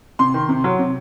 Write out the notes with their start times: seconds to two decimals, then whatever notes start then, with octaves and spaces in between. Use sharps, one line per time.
0.19 C3 C6
0.34 D#3
0.49 C3
0.64 F#3
0.79 C3